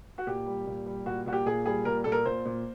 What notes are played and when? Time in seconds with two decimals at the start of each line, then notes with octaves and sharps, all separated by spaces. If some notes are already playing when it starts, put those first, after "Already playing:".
0.18 F#4
0.27 A#2 G4
0.46 G3
0.66 A#2
0.86 G3
1.06 A#2 F#4
1.26 A#2 F#4
1.33 G4
1.46 A#2 G#4
1.65 G3 G#4
1.85 A#2 A#4
2.04 A#2 A4
2.12 A#4
2.25 A#2 C5
2.45 A#2